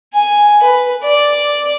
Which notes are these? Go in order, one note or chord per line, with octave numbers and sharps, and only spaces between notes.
G#5
B4
D5